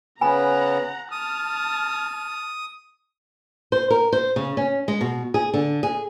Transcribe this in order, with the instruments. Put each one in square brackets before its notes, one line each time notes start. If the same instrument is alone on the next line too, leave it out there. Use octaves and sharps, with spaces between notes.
[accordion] C#3 B3 [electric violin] F#5 A#5 [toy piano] G#5 B5
[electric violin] A5 F6 [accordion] D#6
[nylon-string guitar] C5
A#4
C5
C#3
C#4
G#3
B2
G#4
D3
G#4